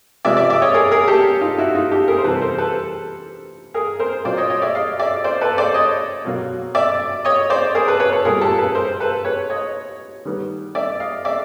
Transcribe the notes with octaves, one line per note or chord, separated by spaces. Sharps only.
C3 F3 G#3 B3 D5 E5
D5 E5
D5 E5
C#5 D#5
G#4 A#4
G#4 A#4
G4 A4
D#4 F4
E4 F#4
D#4 F4
G4 A4
G#4 A#4
C5
C3 E3 G3 A4 B4
A#4 C5
A4 B4
G#4 A#4
A#4 C5
A#2 F#3 A#3 C5 D5
C#5 D#5
C#5 D#5
D5 E5
D#5 F5
D5 E5
C5 D5
A4 B4
C5 D5
C#5 D#5
B2 F#3 A#3
D5 E5
C#5 D#5
C5 D5
G#4 A#4
A4 B4
B4 C#5
A4 B4
A#2 G3 B3 G#4 A#4
G4 A4
A4 B4
A#4 C5
A4 B4
B4 C#5
C#5 D#5
D#3 G3 B3
D5 E5
D#5 F5
D5 E5